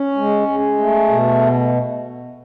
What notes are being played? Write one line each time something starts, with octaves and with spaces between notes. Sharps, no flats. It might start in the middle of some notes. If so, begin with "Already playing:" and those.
Already playing: C#4
G#3
G#3
A3
B2